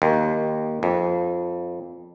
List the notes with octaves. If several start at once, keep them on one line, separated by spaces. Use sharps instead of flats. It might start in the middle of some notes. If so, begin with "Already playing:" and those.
D#2
F2